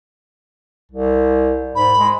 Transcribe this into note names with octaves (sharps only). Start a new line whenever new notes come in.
C2
G#2 B5
G#3